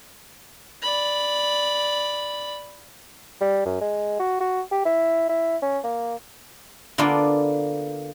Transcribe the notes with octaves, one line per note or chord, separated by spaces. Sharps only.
D5 B5
G3
F#2
G#3
F#4
F#4
G4
E4
E4
C#4
A#3
D3 A#3 B3 F4 D5 A5